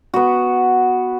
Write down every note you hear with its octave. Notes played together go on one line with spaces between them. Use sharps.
B3 F#4